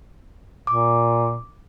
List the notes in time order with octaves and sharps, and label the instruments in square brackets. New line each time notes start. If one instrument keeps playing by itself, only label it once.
[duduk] A#2 [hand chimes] D6